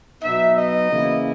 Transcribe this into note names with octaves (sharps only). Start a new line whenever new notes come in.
B2 F#3 B3 D#4 E5
D#5
C#3 E3 A#3 E4